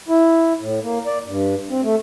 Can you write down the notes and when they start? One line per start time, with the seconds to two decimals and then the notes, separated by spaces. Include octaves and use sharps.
0.09 E4
0.60 A2
0.83 A#3
1.06 D5
1.26 G2
1.70 C4
1.83 A3